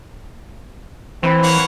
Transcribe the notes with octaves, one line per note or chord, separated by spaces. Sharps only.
E3 C4 B4 C#6
A#3 C#5 F#5